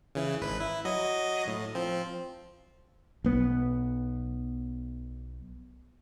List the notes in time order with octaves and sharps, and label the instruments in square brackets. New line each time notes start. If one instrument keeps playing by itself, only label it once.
[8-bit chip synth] C#3 E3
G#1 B4
E4
F#3 D#5
A2
F3 C4
[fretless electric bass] B1 B3